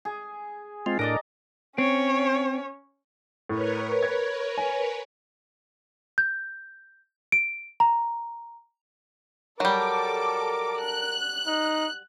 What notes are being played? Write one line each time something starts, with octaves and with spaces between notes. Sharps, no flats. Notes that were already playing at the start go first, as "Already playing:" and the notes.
G#4
G#3 C4 F4
A2 D4 A#4 D5 D#5 A#5
C4 C#4 C#5
A2 A#4 B4 C#5
G#6
G#5
G6
D7
A#5
F#3 G3 A4 A#4 D6
F#6
D#4